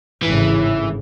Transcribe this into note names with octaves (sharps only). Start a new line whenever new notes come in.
G#1 A2 C#3 E3